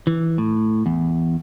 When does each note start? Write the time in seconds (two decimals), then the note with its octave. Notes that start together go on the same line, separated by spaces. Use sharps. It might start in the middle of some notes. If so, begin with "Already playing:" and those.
0.07 E3
0.38 A2
0.86 E2